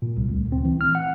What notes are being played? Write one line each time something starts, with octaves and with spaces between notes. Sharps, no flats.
A#2
C2
D2
C4
E3
F6
F#5